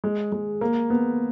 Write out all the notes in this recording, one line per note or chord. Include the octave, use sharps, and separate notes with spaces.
G#3
G#3
A#3
B3